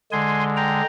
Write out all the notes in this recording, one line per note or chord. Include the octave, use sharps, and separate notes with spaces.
D3 G#3 G#5 C6
G5 A#5